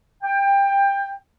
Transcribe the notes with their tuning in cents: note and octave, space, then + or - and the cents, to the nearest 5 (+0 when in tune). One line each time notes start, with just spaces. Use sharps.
G5 +20